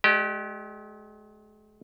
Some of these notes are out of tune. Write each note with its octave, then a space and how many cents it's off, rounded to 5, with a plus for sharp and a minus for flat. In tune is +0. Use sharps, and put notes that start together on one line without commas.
G#3 +40 G4 -20 D5 +45